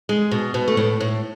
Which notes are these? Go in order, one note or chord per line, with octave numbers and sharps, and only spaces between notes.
G#3
B2
B2
A3
A2 B3
A2